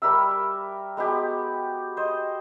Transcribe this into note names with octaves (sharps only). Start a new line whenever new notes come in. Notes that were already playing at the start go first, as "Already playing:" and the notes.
G3 A#4 E5 E6
G#3 B3 F#4 G4
C5 D#5